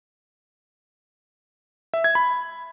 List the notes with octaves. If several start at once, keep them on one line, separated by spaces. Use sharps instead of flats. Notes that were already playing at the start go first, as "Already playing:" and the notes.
E5
G#6
B5